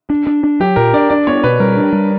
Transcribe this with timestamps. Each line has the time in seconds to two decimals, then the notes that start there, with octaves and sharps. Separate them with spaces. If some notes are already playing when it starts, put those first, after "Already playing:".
0.10 D4
0.27 D4
0.44 D4
0.60 F#3 G4
0.76 A#2 A#4
0.93 D4 D5
1.10 D4 D5
1.27 B3 C#5
1.43 B2 B4
1.60 G3 A#4
1.77 D4
1.93 G3